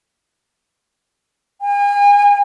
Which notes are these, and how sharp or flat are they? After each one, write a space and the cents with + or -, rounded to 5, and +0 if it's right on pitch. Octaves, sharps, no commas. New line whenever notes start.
G#5 -40